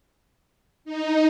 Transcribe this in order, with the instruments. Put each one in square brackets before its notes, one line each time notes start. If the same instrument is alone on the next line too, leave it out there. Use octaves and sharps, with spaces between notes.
[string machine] D#4